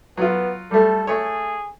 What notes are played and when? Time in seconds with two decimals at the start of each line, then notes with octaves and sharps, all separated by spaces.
0.17 F#3 B3 F4
0.71 G3 A3 A4
1.07 A3 G#4 C#5